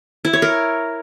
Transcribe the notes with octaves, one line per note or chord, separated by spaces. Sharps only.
E4
C#5
A#4